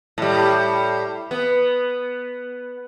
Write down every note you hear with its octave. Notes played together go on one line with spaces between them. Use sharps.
A2 G3
B3